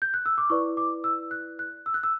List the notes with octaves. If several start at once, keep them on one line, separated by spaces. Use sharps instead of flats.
G6
F#6
E6
D6
E4 B4 D5 C#6
D6
E6
F#6
F#6
E6
F#6
E6